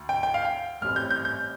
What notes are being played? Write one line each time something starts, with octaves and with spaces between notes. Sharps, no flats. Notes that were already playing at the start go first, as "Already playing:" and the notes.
Already playing: D2
G5
G5
F5
G5
A1 A2 G3 C4 F6
G6
G6
G6